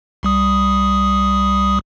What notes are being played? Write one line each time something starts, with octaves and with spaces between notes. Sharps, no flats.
C2 G3 D#6